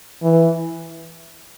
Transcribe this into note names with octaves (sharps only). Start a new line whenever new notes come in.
E3